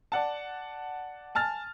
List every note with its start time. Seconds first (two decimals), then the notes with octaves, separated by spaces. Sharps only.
0.12 D5 F#5 A5
1.35 G#5 A5 F6 A6